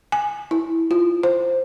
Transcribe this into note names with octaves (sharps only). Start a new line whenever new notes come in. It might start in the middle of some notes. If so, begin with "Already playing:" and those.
G#5
E4
F4
C5